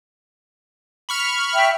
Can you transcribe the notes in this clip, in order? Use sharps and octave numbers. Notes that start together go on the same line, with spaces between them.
B5 C#6 F6
E5 G5